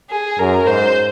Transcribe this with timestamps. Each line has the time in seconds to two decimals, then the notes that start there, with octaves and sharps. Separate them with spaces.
0.10 G#4
0.39 F#2 A#4
0.66 G#2 C5